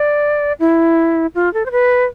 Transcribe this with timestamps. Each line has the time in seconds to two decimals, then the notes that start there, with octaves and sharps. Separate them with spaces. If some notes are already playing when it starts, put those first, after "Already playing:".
Already playing: D5
0.60 E4
1.35 F4
1.54 A4
1.66 C5
1.71 B4